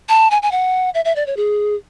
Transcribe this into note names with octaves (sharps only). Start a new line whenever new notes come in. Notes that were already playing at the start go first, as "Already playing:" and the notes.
A5
G#5
G#5
F#5
E5
E5
D5
C#5
G#4